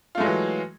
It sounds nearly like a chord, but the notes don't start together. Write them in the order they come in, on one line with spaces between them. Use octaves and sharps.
F4 A3 G#3 F#3 E3